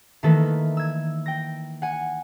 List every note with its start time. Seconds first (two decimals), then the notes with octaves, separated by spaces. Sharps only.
0.23 D#3 E3 A3 A#3 A4 B4
0.77 E6 G#6
1.26 G5 A#6
1.82 F#5 G#5